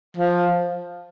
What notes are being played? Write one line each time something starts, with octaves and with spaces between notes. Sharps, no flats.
F3